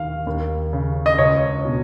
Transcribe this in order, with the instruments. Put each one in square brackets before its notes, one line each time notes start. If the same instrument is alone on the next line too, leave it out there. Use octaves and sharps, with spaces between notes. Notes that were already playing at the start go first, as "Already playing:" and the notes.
Already playing: [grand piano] D#2 D#3 F5
D#2
C#3
D#5
C#2 C#5
B2